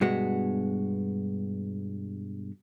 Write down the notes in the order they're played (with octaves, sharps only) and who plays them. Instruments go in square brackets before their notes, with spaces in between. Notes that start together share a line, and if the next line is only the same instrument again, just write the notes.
[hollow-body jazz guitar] G2 B2 G#3 B3 F#4